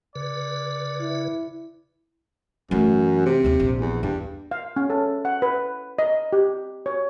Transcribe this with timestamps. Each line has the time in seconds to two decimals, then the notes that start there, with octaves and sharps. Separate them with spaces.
0.15 C#3 B4 D5
1.01 E4
2.71 F#2 E3 A3
3.25 C3
3.44 D#2 C4
3.60 A#1
3.81 E2
4.03 E2 G2
4.51 F5
4.76 C#4
4.90 A4
5.25 F#5
5.42 B4
5.99 D#5
6.33 G4
6.86 C#5